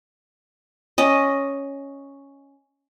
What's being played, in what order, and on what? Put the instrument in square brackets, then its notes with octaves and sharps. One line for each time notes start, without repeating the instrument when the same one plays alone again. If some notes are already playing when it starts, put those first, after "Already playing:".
[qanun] C#4 D#5